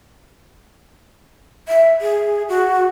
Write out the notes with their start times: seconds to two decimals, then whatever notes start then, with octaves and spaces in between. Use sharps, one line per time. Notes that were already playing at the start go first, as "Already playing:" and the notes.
1.68 E5
2.01 G#4
2.49 F#4